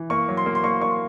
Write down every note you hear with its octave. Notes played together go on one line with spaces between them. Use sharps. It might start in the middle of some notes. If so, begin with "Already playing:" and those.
Already playing: E3
A#3 C#6
F#3
C6
A#3
C6
A#3 C#6
A#3 C#6
C6